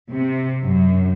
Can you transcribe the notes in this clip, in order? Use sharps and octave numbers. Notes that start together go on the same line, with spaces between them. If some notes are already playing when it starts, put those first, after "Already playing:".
C3
F#2